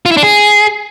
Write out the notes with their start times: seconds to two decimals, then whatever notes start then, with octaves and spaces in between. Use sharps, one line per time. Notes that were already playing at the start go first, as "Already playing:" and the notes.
0.06 F4
0.11 E4
0.17 D4
0.23 G#4